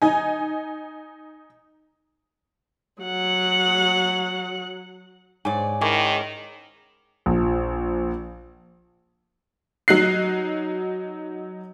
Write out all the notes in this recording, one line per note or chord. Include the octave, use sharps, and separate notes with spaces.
D#4 G#5
F#3 F#5
G#2 C#5 D5 G#5
D#3 C#4 E4 G#4 A#4 D6
A#1
F#3 D#4 F#6 C7